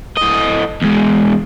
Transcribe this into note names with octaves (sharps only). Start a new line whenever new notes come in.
A2 D#5
E2 G#3